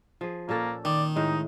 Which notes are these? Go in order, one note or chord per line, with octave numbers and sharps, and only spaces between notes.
F3 G#4
A#2 A#3 C#4 A4
D#3 D5
A2 G#3 D#4